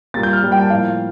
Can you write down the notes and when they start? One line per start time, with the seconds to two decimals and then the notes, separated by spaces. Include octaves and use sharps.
0.14 A#2 G3 A#3 A6
0.23 G6
0.33 F6
0.43 A#2 G3 A#3
0.52 G5
0.61 A5
0.70 A2 F3 A#3 F5